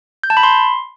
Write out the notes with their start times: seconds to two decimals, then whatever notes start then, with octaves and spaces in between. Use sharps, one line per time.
0.24 G6
0.30 A5
0.37 B5
0.43 C6